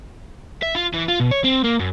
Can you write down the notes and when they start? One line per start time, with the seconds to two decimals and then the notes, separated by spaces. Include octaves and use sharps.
0.62 E5
0.75 F4
0.93 E3
1.08 F4
1.20 B2
1.31 C#5
1.44 C4
1.64 A#3
1.80 F#2